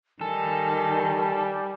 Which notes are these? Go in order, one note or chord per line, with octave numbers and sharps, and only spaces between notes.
D#3 G3 A4 G#5